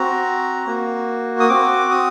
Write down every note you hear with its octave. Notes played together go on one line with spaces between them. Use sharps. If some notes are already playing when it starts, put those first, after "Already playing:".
Already playing: C4 F#4 A#5
A#3 F#4
D#6
C4 F#4 D6
D#6